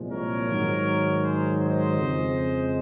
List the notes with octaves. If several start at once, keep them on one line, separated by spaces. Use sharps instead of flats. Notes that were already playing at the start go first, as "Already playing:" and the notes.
Already playing: C2 A#2 F3 G#3
A#4 C#5
G#2 D#3 F#3
G#4 C5
C5 D#5
F2 C#3 G#3